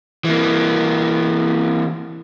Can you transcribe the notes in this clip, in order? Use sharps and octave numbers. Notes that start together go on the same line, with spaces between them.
E3 A#3